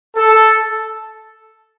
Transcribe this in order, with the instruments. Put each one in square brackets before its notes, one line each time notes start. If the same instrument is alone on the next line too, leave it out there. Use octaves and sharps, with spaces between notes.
[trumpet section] A4